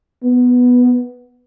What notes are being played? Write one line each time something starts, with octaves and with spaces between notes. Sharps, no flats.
B3